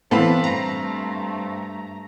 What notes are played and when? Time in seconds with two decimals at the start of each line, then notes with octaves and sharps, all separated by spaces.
0.11 A2 E3 B3 C4 A4 B4 F5 B5
0.44 G2 A3 A#5